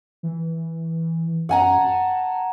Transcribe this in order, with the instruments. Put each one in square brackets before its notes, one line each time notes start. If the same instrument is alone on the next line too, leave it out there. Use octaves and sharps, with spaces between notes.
[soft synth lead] E3
[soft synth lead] F#2 [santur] F#5 G#5 A#5
[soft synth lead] A5